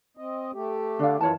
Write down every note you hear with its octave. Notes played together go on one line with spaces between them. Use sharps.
C4 D#5
A3 G4
D3 D4 F5
F#2 D#3 E3 F4 C#5 A5